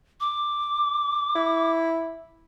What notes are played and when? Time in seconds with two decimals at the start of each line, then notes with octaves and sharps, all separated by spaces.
0.20 D6
1.35 E4